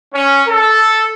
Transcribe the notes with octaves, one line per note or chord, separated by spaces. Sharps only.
C#4
A4